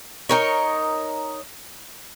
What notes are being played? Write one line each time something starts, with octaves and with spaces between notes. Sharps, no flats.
D#4 A#4 C#5